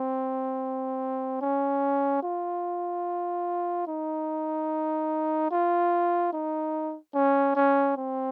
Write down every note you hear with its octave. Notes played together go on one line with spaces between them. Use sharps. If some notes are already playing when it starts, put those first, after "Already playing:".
Already playing: C4
C#4
F4
D#4
F4
D#4
C#4
C#4
C4